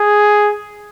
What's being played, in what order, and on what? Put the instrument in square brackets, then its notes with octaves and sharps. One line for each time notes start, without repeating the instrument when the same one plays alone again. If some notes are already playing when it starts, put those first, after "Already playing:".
Already playing: [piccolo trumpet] G#4